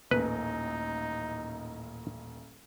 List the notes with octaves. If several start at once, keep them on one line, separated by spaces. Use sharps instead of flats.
D#1 A1 A#3 D#4 B4